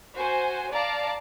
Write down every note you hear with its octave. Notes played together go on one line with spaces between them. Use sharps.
F#4 C5 G#5
D5 F5 A5 A#5